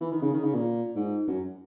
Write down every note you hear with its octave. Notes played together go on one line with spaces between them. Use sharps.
E3
D#3
C#3
D#3
C#3
A#2
G#2
F#2